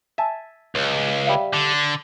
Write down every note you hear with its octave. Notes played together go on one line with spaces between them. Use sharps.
E5 G#5 A5
C#2
G3 E5 F5
D3